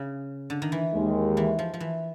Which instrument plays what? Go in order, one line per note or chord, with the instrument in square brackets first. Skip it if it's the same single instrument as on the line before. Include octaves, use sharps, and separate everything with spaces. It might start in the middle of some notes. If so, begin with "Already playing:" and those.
Already playing: [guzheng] C#3
D3
D#3
E3
[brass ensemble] D#2 D#3 G#3
[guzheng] E3
F3
F3
E3